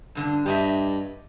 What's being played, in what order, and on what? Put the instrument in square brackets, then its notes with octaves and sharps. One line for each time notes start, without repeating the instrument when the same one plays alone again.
[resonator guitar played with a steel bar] G2 D3 D4
[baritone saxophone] G2 [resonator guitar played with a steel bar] G4 D#5 E5